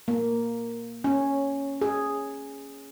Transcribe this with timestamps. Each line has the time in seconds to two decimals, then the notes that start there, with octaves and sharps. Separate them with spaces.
0.08 A#3
1.04 C#4
1.81 G#4